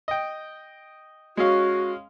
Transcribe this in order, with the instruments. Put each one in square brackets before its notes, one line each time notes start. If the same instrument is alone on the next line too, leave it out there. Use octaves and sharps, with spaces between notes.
[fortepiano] D#5 G5
[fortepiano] G#3 C#4 F5 [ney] F#4